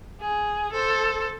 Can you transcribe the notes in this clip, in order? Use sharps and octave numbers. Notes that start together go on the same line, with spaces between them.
G#4
A4 C5